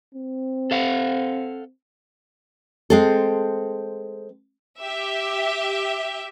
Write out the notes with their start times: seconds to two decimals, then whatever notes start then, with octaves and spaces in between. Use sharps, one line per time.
0.14 C4
0.71 A4 F5 F#5
2.90 G#3 C4 A4
4.80 G4 E5